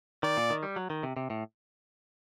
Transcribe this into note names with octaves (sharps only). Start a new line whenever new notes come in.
D#3 D5
A#2
D#3
G3
F#3
D#3
C3
C3
A2